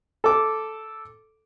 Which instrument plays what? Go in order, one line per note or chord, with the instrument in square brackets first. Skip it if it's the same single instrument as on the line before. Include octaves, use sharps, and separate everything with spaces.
[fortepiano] A4 D6